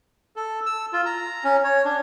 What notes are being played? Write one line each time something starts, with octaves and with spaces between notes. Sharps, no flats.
A4
E6
F4
A#5
C#4
C#5
D4